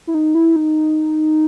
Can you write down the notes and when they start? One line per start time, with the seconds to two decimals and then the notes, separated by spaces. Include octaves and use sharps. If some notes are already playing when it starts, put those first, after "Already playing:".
0.07 E4
0.14 D#4
0.35 E4
0.56 D#4